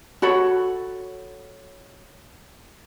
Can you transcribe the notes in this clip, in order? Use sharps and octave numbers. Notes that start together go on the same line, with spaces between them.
F#4 A4 C#5 B5